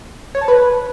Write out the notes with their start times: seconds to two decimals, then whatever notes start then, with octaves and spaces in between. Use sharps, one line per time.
0.35 C#5
0.41 A5
0.48 B4